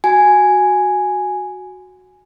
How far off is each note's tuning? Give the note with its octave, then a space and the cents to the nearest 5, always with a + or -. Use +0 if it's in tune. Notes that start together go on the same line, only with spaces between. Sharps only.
F#4 +0 G#5 +0